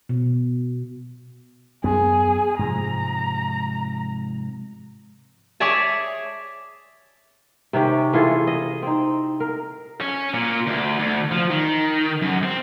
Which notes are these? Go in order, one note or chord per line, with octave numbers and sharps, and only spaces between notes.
B2
F#2 B3 G#4
G#2 C3 F3 A#5
G#4 C#5 D5 E5 G#5 A5
C3 D#3 C#4 G4
E3 F4 G#4 A4
D#5
C4 D#4
A#4
C#4
A#2
D2
D2
F3
D#3
F#2
C4